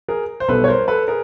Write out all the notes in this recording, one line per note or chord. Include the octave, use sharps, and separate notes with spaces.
G#4 A#4
C5
B1 B2 G3 A4 B4
C#5
A#4 C5
A4 B4
G#4 A#4